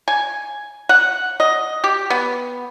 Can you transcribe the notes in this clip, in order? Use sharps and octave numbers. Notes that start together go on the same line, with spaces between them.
G#5
F#5
D#5
G4
B3